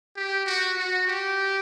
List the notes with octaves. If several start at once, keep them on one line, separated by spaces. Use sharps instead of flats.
G4
F#4
F#4
G4